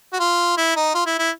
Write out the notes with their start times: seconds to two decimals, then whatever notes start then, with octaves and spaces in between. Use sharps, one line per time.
0.13 F#4
0.19 F4
0.57 E4
0.76 D#4
0.95 F4
1.06 E4
1.19 E4